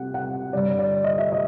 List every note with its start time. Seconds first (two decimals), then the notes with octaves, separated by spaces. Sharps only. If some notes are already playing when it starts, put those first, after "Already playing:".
Already playing: C3 F#5
0.14 F#5
0.53 G2 D3 G3 D5
0.79 D5
1.04 D#5
1.18 E5
1.32 D#5